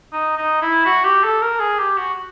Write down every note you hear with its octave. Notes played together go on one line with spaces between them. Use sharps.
D#4
D#4
E4
F#4
G4
A4
A#4
G#4
G4
F#4